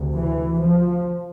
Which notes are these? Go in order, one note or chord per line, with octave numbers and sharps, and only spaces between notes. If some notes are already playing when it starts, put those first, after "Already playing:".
Already playing: D2 C3
E3
F3